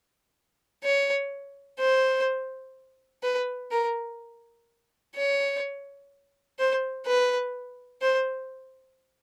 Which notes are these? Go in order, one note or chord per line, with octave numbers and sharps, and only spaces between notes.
C#5
C5
B4
A#4
C#5
C5
B4
C5